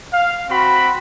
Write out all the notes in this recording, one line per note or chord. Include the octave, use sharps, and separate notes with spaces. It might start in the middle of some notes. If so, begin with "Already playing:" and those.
F5
C4 F#4 B5